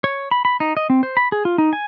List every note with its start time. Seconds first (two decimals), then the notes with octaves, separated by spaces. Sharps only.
0.04 C#5
0.31 B5
0.45 B5
0.60 D#4
0.77 D#5
0.90 C4
1.03 C5
1.17 B5
1.32 G#4
1.45 F4
1.58 D#4
1.73 G#5